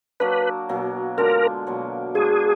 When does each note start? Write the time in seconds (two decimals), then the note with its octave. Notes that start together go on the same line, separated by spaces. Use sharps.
0.20 F#3 A#3 D4 B4
0.69 B2 F#3 A#3
1.18 D3 G#3 D4 F4 A#4
1.67 B2 F#3 A#3
2.15 G#3 D4 F#4 G#4